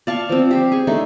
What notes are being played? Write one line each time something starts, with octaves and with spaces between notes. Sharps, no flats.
D5 F5 A5 C#6
F3 C4
G4 C5
G#4 C#6
A3 D4 D#4